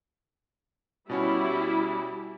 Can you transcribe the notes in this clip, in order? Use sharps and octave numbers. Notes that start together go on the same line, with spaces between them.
B2 G3 C#4 E4 F#4